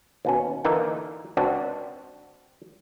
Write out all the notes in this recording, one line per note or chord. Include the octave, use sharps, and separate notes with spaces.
D#2 B2 C#4
D3 E3 A#3 D#4
C#2 C4 D4 F#4